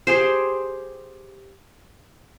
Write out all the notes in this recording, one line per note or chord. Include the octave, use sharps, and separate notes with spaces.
G4 G#4 C5